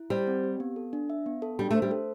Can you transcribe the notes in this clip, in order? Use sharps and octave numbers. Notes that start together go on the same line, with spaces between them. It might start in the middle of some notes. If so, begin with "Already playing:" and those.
Already playing: E4
G3 C5
C4
G4
B3
A4
D4
E5
B3
A4
G3 D4
A3 C5
G3
A4